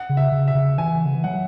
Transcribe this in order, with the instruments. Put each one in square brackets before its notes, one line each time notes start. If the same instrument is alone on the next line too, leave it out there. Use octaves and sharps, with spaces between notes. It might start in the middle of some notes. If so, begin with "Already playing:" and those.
Already playing: [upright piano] F#5
[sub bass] C#3
[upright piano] E5
[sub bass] C#3
[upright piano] E5
[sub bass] C#3
[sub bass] E3 [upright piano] G#5
[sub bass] C#3
E3
[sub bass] F#3 [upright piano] F#5